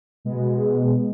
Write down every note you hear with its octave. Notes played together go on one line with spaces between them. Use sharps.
B2 G#3 B3